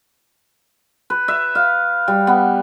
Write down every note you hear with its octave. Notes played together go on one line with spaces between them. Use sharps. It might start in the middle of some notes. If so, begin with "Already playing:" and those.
B4
E5
F5
G3
B3